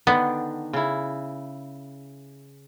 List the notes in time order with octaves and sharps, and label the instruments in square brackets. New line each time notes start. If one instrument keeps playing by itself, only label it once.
[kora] D3 D#3 D4 [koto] B3
[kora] C#3 E4